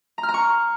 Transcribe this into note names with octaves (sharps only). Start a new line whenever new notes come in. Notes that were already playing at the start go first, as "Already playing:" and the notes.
A#5
F6
A#5
C#6